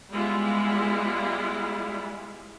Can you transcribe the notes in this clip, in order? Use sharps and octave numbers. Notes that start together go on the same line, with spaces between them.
G3 G#3 B3 E4 F4